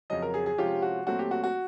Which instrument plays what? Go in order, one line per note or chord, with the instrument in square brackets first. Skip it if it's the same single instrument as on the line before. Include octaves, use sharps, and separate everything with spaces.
[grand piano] F2 C#3 F#3 D#5
A#4
G#4
G#4
C3 F3 G#3 C#4 F4 G4
F#4
A#2 F#3 A3 C4 F#4
G4
F#4
F#4